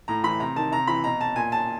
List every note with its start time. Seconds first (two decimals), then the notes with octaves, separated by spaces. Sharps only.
0.08 A2 A#5
0.23 E3 B5
0.40 C3 A#5
0.56 D#3 A5
0.72 C3 A#5
0.87 E3 B5
1.04 B2 A#5
1.21 A5
1.36 A#2 G#5
1.52 A5